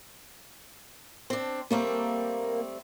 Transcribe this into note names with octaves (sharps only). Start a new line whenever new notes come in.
C4 D4
G3 A3 A#3 C4